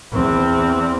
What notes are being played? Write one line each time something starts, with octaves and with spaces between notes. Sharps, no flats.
E2 C4